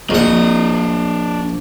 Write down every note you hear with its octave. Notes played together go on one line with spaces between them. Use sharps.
A#1 D4 D#5 F#5